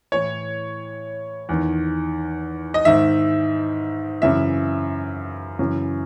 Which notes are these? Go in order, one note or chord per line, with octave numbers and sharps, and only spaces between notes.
A2 E3 C#5
E2 D#3
D#5
G#2 D#3 E5
F#2 C#3 E3 E5
F#2 C#3 E3